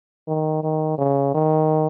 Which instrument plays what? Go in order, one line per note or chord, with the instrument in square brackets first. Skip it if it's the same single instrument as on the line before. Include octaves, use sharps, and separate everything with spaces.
[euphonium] D#3
D#3
C#3
D#3